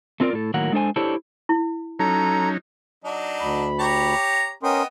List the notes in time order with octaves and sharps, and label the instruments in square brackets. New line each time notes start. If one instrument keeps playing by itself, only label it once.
[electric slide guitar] A3 C4 F4 A#4 D5
A2 A4
A2 D#3 F#3 A#3 A#4 F#5
G#3 D4 A4 C5 G#5
D4 E4 G4 A4 C5 C#5
[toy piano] E4
[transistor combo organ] F#3 C#4 D#4 [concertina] A4 A#5
[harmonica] F#3 D4 D#4
[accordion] D2 B5
[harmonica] G4 C#5 A#5
[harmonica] B3 D#5 G5 [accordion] C#4 A#4 C6